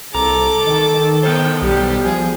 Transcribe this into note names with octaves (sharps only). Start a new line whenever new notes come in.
C2 A4 A#5 D6
D#3
B3 A4 C5 G5
B1 G3 G4
F3 G#4